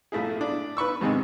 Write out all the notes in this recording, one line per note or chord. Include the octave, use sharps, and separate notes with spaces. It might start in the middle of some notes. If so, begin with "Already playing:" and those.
A#1 A3 E4 G#4
D4
B4 B5 C#6 E6
G#2 C3 D#3 C4 G#4 D#5